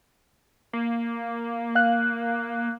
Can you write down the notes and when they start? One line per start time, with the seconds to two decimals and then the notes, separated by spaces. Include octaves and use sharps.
0.73 A#3
1.75 F5 F#6